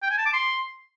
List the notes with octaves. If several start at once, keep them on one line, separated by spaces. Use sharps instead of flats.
G5
G#5
A5
D6
C6